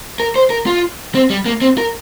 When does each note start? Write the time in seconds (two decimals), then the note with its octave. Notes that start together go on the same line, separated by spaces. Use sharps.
0.20 A#4
0.36 C5
0.50 A#4
0.66 F4
1.15 C4
1.30 G3
1.46 A#3
1.62 C4
1.78 A#4